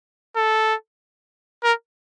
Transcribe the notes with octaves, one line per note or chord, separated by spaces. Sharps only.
A4
A#4